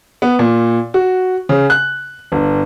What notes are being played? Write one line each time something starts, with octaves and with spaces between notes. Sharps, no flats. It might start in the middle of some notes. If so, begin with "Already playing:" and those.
B3
A#2
F#4
C#3
F#6
G1